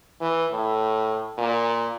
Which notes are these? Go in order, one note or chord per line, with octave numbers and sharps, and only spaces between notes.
E3
A2
A#2